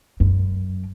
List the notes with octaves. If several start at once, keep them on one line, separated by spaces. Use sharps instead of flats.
F#2